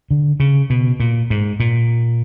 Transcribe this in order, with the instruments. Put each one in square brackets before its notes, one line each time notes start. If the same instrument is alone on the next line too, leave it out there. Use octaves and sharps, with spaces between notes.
[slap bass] D3
C#3
B2
A#2
G#2
A#2